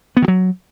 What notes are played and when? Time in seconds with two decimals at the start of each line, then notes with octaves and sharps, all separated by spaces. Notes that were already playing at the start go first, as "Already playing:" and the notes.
0.17 B3
0.22 D#3
0.28 F#3